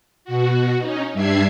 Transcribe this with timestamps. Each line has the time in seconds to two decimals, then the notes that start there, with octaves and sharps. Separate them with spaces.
0.25 B2 F#4
0.80 C#4 D#4
1.13 G2 G3 D4 E5 G#6 C7